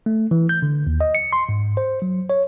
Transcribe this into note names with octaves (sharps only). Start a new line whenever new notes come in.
A3
E3
G6
D3
D#2
D#5
C#7
C6
G#2
C5
F#3
C#5